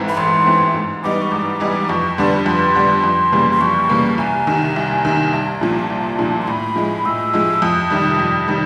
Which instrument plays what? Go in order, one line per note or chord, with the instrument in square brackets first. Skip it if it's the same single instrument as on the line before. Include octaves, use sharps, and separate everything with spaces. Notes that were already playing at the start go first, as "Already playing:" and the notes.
Already playing: [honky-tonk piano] A1 G#2 E3 A3 C4
[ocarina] B5
[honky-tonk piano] A1 [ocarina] C6
[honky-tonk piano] G#2 E3 A3 C4
G#2
[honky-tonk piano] E3 G3 B3 D#4 [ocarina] D6
[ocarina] C#6
[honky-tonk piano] G#2 [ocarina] D6
[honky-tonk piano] E3 G3 B3 D#4
[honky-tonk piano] F2 [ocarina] C#6
[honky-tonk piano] D3 G3 B3 D4 [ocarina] C6
[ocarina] B5
[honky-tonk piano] F2 [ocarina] C6
[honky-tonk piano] D3 G3 B3 D4
F2
C#3 E3 G3 A#3
[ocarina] C6
[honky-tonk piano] F2 [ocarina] C#6
[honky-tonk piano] C#3 E3 G3 A#3
[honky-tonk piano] C2 [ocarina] G#5
[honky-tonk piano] C3 D#3
C2
C3 D#3
[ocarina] A#5
[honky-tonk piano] C2 [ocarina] A5
[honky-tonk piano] A#2 F3
C2
A#2 F3
[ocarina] C6
[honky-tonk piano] A2 [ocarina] B5
[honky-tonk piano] F3 G#3
[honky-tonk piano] A2 [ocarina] E6
[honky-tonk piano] F3 G#3
[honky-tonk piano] F2 [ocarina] D#6
[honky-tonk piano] C3 D#3 G3
F2
C3 D#3 G3